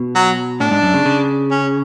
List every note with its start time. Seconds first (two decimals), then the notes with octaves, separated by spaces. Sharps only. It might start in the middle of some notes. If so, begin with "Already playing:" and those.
Already playing: B2
0.15 F#3
0.60 A2 D4
0.71 G#2
0.82 F#2
0.94 C#3
1.05 C#3
1.51 C#4